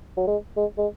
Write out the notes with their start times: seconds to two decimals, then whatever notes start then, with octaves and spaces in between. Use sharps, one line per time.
0.17 F#3
0.27 G#3
0.57 G#3
0.78 G#3